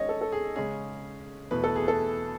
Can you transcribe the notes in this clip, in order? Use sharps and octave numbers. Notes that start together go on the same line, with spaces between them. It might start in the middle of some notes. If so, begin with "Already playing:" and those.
Already playing: D#3 G#3 C#4 C#5 D#5
A4
A4
G#4
C#3 G#3 C#4 G#4
E2 B2 A3 B4
A4
G#4
A4